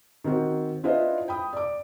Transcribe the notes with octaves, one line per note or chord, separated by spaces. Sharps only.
D#3 C4 F#4
D4 E4 F4 B4 C5 D#5
G5 B5 D#6
D5 D6